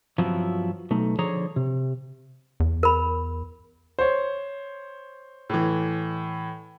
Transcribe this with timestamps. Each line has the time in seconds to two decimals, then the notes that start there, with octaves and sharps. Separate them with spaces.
0.18 G2 F3 F#3 B3 C4 E4
0.91 B1 A3 D#4
1.19 D3 F3 G#4 C#5 A#5
1.56 C3
2.60 E2
2.83 A#4 B5
3.99 C5 C#5
5.50 A2 E3